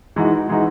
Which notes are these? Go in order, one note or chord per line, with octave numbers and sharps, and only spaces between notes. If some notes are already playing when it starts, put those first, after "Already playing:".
E3 G#3 D#4 F#4
E3 G#3 D#4 F#4